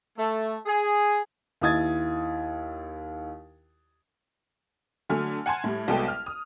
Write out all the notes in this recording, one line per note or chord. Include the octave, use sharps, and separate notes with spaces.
A3
G#4
D#2 E4 D#6 G#6 A6
D3 F#3 A3 G#5 F6
F#5 G#5 A5 C6 G#6
A2 G3
C2 F#3 G#3 B3 A4 G5
F6
D#6